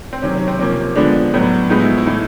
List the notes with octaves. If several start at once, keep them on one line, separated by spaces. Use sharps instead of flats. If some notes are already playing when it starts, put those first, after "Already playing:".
C4
C3 D#3 F#3 C#4
C#4
C4
C3 F3 A#3 C#4
D3 F3 G#3 B3 D4
A2 F#3 B3
A2 F3 G#3 B3 D#4
E4
E4
A2 E3 A3 D#4